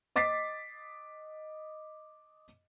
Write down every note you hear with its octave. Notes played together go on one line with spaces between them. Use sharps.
D#5 D6 A6 B6 C7